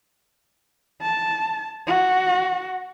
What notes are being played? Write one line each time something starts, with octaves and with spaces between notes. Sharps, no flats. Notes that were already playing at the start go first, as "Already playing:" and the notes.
A5
F#4